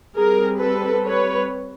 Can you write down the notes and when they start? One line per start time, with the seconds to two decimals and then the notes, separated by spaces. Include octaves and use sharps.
0.15 G3 C4 G#4 A#4
0.60 A4 B4
1.05 B4 C#5